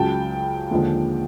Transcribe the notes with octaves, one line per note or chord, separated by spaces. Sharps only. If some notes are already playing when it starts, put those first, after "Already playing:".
Already playing: C#2 C#3 F#3 G5 A5
D#2 D3 F3 G#3